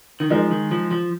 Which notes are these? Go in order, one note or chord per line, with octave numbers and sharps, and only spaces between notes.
D#3
F3 G#3 D#4 A#4
D#3
F3
F3